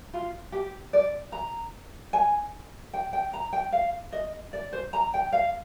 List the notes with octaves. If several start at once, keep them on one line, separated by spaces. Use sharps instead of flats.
F4
G4
D5
A#5
G#5
G5
G5
A#5
G5
F5
D#5
D5
C5
A#5
G5
F5